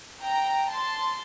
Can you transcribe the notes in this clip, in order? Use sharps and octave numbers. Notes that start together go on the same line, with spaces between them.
G5 A#5
A5 C6